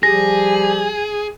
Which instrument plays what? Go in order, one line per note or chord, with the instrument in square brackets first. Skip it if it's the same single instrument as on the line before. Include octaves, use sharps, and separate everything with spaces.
[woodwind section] F3 G3 G4 [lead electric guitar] G#4 [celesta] A#6